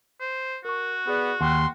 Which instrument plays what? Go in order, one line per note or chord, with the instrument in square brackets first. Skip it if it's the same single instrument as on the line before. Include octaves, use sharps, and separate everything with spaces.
[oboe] C5
[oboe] F#4 [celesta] A#4 C#6
[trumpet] B3 [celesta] G#4 D5
[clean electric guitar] D#2 [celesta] F#5 G5 [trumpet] C6